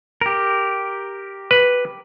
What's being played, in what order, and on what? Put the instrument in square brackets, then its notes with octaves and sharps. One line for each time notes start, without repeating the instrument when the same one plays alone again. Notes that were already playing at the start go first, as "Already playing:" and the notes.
[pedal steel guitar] G4 A#4
[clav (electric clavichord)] B4